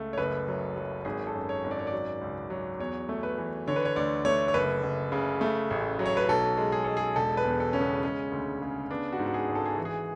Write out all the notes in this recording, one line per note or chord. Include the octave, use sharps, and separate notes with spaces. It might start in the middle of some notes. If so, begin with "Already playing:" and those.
Already playing: C#2 A3
C#5
F#1 B4
F#3
F#3
G#1 G#4
A4
F#2
C#5
G#1
D5
C#5
D5
F#3
C#2
F#3
E2 C#5
A3
B4
E3
D3 C#5
B4
C#5
D2 D5
A3 C#5
C#5
F#1 B4
F#1
C#3
A3
A1
F#3
C#5
B4
B1 A4
G#3
G#4
G#3 A4
G#4
E1 A4
B4
E2
A4
C#3 C#4
B3
G#3 C#4
D2
C#3
B3 D4
F#4
G#2
F#4
G#4
G#1
A4
G#4
E3 F#4
G#4